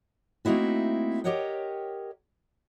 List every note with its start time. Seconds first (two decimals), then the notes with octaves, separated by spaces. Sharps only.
0.45 A3 A#3 C4 D#4 E4 F#4
1.24 G4 A#4 C#5 D#5 F#5 G5